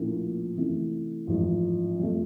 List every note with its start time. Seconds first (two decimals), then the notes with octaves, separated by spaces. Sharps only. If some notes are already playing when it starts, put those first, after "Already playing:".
Already playing: A#1 A2 F3 A#3 C#4
0.56 C3 E3 A3 C#4
1.27 A1 G#2 F3
1.99 F2 C3 F3 A3